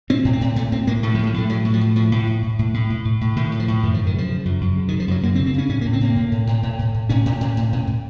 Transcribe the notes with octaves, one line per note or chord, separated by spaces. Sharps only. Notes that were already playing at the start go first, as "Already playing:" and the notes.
A2 C4
A2
C4
A2
A2 A3
A2 C4
A2 A#3
A2 A3
F3
A2
F3
A2 A3
A2 F#3
A2
F3
A2
A2 F3
A2
A2
A2
A2
A2
A2
A2
A2
A2 D#3
A2
F3
A2
F#2 D#3
F3
F#2
D#3
C#3 F3
C#3
F#2
F#2
C#3
D#3
C#3
F3
F#2 F#3
F#2 A#3
C4
C#3
C4
C#3 C#4
A2 C#4
A#3
A2
C4
A2 A#3
A2
A2
A2
A2
A2
A2
A2 C#4
A2
A2
A2
A2
A2